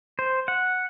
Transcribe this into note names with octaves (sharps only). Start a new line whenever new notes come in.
C5
F#5